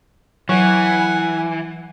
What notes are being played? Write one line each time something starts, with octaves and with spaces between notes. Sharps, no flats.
E3 F#3 F#5 G#5